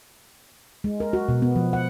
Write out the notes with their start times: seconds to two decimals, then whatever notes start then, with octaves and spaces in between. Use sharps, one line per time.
0.84 G#3
1.00 A#4
1.13 F#4
1.28 B2
1.42 B3
1.56 F3
1.73 F#5